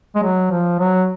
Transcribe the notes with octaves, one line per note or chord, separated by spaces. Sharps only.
G#3
F#3
F3
F#3